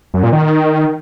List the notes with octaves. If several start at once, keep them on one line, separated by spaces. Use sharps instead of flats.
F#2
A#2
D#3